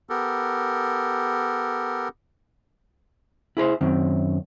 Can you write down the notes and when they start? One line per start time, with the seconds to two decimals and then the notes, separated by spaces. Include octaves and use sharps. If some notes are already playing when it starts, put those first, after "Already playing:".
0.10 B3 G4 A4 A#4
3.57 E4 G#4 A#4 C5
3.81 F#2 D#3 C4